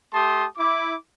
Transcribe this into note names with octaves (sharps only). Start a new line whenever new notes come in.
A3 G4 A5 C6 D#6
E4 D6